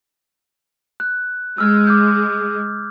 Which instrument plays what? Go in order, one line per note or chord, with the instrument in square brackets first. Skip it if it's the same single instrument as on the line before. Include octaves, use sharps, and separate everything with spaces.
[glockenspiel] F#6
[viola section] G#3 [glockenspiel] E6 F6 G#6
[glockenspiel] D6 F6 G6